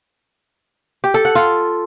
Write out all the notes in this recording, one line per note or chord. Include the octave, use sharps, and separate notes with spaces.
G4
A4
F#5
F4